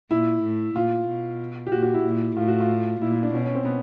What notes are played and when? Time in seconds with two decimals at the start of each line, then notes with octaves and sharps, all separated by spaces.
0.11 A#2 E4
0.43 A2
0.75 A#2 F4
1.08 B2
1.67 G4
1.72 A#2 F#4
1.82 F#4
1.94 E4
2.04 A#2
2.36 A2 F4
2.48 F#4
2.60 F4
3.01 A#2 E4
3.12 E4
3.23 D4
3.34 B2 C#4
3.44 C#4
3.55 C4
3.65 B3